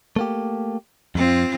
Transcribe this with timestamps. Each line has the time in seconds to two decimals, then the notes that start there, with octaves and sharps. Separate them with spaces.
0.16 A3 A#3 G4
1.15 F2 C4 F4